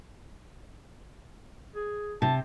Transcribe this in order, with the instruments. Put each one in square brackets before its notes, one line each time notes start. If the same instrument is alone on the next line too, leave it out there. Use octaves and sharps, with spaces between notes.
[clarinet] G#4
[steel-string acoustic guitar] C3 [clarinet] A5